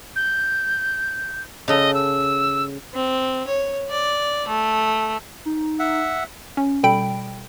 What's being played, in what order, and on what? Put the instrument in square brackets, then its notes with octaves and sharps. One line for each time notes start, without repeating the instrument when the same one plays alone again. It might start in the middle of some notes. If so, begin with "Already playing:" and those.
[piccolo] G6
[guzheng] C#3 A4 [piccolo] D#5
[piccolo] E6
[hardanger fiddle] C4
C#5
D5
A3
[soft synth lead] D#4
[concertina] E5 F#5
[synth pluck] C#4
B2 G3 A4 G5 B5 D7